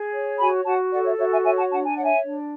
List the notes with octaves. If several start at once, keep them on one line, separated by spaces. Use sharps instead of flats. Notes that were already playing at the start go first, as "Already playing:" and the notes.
Already playing: G#4
C#5
F#4 G#5 B5
F#4 F#5 A5
A4 D5 F#5
C#5 E5
F#4 C#5 E5
E5 G#5
C#5 E5 G#5
F#5 A5
D4 F#5 A5
G#5
C#5 F#5
E5 G#5
D4